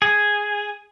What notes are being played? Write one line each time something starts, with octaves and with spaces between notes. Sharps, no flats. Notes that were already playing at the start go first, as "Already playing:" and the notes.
G#4